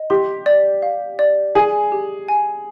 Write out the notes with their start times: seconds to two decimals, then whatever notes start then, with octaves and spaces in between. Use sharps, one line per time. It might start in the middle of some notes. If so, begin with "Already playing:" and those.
Already playing: D#5
0.10 G4 C6
0.46 D5
0.82 F5
1.19 D5
1.55 G#4 G#5
1.92 G4
2.28 G#5